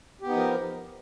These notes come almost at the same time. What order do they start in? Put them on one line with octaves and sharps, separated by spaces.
G4 B3 D#4 F3 A#4